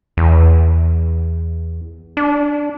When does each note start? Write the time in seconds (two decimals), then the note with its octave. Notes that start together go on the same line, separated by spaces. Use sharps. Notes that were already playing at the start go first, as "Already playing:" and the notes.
0.17 E2
2.17 D4